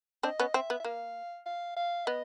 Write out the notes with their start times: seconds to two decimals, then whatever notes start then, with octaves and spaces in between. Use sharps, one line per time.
0.23 C4 D4 D#5
0.40 B3 C#4
0.54 C4 E5
0.70 B3
0.80 E5
0.84 A#3 F5
1.46 F5
1.76 F5
2.06 B3 D#5